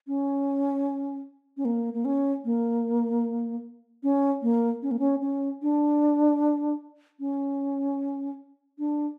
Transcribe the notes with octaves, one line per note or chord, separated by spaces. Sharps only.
C#4
C#4
A#3
A#3
C#4
A#3
C#4
A#3
C#4
A#3
C#4
C#4
D4
C#4
D4